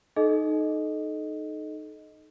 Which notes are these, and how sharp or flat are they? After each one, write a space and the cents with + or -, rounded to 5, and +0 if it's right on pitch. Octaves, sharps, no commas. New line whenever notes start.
D#4 -10 A4 -30 D#5 +0